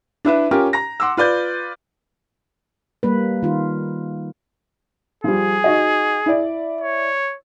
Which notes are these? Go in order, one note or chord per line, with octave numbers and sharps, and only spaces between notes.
D4 E4 B4 E5
C#4 F4 G4 A#4
A#5 A#6
F#5 C6 D6 E6
F4 B4 D5 G6
G3 A#3 B4
D#3 F4
F3 G3 G#4
D#4 F#4 D#5
E4 D5
C#5